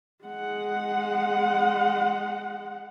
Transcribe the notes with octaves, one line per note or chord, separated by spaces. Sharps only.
G#3 F#5